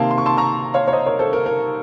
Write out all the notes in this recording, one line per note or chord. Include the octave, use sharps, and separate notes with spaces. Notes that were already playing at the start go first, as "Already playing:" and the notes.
Already playing: C3 D#3 A#3 A5 C6
C6
C#6
A5 C6
A#5 C#6
C#5 F5
C#5
C5 D#5
A#4 C#5
A4 C5
A#4
A#4